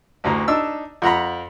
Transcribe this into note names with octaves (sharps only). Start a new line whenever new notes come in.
A1 D2 A#5
D4 D#4 E6
F2 F#5 A#5 B5